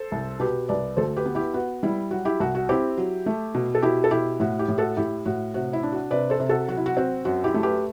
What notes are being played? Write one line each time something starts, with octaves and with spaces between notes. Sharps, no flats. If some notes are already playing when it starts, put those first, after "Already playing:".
Already playing: A4 C5
C2
B2 G4 B4
C2 B4 D5
D2 A4 C5
G4 B4
B3
E4 G4
B3 F#4
G3 E4
F#3 F#4
E4 G4
C2 F#4
F#4
C4 E4 G4
F#3
A3
B2
A4
B2 E4 G4
A4
B2 E4 G4
A2 F#4
E4 G4
A2
F#4 A4
A2 E4 G4
A2 F#4
C3 F#4
E4
D4
F#4
C3 B4 D5
A4 C5
C3
F#4 A4
F#3 F#4
E4
F#4
C4 F#4
F#2 F#4
E4 G4
A3
G4 B4